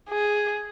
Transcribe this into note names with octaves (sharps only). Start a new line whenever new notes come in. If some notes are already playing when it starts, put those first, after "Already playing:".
G#4